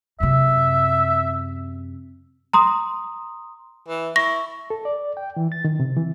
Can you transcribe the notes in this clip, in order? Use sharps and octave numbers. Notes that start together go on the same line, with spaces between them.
F#2 C3 E5
A#5 C6 D#6
E3
E4 C#6 A#6
A4
D5
G5
E3
A6
D#3
C3
E3